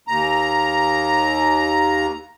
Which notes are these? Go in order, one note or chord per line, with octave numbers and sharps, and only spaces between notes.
D#2 A#5